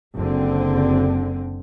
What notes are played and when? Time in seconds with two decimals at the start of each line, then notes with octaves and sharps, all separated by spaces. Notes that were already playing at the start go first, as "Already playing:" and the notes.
0.14 F#1 D3 C4